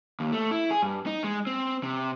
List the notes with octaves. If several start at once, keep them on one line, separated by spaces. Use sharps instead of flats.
D#2
A3
E4
G#4
G2
D#4
G#3
C4
C3